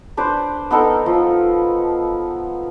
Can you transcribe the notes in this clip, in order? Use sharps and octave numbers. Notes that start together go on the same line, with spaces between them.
D4 B4 C5 D5
B3 D#4 A4 A#4
F3